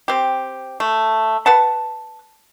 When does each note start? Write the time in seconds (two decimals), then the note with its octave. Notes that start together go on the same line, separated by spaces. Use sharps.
0.08 C4 G4
0.80 A3
1.46 B4 F#5 A5